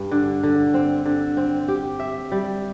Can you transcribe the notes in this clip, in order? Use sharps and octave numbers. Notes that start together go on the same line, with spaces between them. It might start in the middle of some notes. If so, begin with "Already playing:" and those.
Already playing: G2
D3
D3
C4
D3
C4
G4
E5
G3